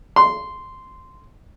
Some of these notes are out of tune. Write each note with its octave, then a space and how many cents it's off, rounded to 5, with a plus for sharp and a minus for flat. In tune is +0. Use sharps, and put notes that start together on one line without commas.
C6 -10